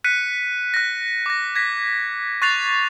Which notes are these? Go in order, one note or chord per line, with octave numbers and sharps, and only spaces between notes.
F#6 B6 C#7 D#7
F#6 A#6
D6 A#6
G#6 A#6 B6
C#6 F#6 A6 C7 F7